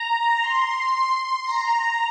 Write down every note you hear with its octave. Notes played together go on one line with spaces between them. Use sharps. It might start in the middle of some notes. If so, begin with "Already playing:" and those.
Already playing: A#5
C6
A#5